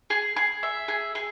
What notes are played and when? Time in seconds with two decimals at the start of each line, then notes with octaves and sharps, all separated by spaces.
0.10 G#4
0.36 G#4
0.63 E5
0.88 G#4
1.15 G#4